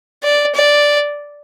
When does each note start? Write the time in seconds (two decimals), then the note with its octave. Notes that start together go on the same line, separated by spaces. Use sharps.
0.24 D5
0.55 D5